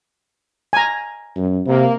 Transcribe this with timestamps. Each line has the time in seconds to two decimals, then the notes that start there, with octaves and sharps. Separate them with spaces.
0.73 G#5 A#5
1.36 F#2
1.67 C3 A#3